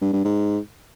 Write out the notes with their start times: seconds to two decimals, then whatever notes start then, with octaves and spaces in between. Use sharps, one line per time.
0.01 G2
0.13 G2
0.25 G#2